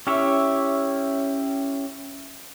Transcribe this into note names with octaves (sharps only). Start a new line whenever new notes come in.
C#4 E4 G4 C#5 E5